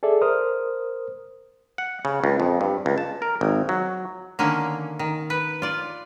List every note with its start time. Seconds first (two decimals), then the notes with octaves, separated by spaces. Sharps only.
0.03 G#4 A4 D5 E5
0.21 A#4 C5 D#6 F6
1.78 F#5
2.05 C#3
2.24 C#2
2.40 F2
2.61 G2
2.86 C#2
2.98 A5
3.22 A#4
3.41 G#1
3.69 F#3
4.39 D3 D#3 A#3 C#4
4.99 D#3
5.30 B4
5.62 F4 D5